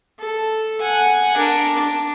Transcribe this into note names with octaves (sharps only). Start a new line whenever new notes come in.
A4
F#5 G#5
D4 A#4
D4